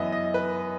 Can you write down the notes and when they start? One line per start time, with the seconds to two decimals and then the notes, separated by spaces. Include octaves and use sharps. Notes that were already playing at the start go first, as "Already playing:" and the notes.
Already playing: F#2 E3 B3 D#5 E5
0.12 D#5
0.34 B4